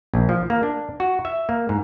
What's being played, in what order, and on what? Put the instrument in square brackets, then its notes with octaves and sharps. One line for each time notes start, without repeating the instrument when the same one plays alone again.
[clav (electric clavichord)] A#1
F3
A#3
D4
F#4
E5
A#3
G#2